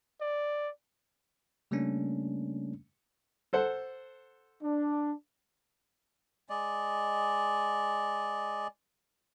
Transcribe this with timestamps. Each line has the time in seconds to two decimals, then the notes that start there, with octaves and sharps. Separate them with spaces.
0.21 D5
1.71 C#3 G3 A3 A#3 C#4 D4
3.53 A4 C5 F#5
4.62 D4
6.49 G#3 D5 D#5